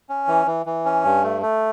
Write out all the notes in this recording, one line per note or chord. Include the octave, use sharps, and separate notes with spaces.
C#4
E3
E3
E3
C#4
G2
A3
A3